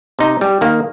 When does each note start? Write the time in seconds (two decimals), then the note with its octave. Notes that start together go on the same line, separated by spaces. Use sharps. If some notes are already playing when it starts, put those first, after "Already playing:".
0.19 C3 D#4
0.41 G3
0.61 D#3 A#3